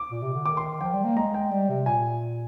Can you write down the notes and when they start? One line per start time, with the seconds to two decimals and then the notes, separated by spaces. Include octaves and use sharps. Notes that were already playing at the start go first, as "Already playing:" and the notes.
Already playing: D6
0.11 A#2
0.22 C3
0.34 D3
0.45 D#3 D6
0.57 C6
0.81 F3 G5
0.93 G3
1.04 A#3
1.16 G#3 A#5
1.34 G5
1.51 G3
1.69 C3
1.86 A#2 G#5